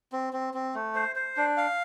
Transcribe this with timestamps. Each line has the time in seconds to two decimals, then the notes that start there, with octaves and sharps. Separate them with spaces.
0.12 C4
0.33 C4
0.54 C4
0.74 A3
0.95 C5
1.16 C5
1.37 D4
1.57 F5